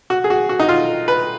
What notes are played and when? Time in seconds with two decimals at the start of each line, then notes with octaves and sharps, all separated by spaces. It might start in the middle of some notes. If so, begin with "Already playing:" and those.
0.10 F#4
0.24 G#4
0.30 F#4
0.49 F#4
0.59 D#4
0.69 F4
1.08 B4